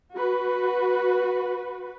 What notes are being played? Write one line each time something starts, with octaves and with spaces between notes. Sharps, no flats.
F#4 B4